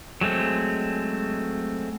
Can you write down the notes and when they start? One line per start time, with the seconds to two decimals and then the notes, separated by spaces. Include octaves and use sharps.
0.21 F#3 G#3 A3 C4